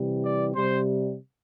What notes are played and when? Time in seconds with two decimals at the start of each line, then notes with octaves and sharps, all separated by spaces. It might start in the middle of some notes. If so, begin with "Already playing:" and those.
Already playing: C3 E3 G3
0.23 D5
0.55 C3 G3 C5